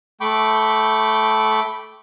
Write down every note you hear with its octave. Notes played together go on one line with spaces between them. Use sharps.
A3 G5 B5 C#6 D6 G6